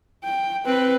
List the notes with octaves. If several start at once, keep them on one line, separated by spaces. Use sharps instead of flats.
G5
C4 B4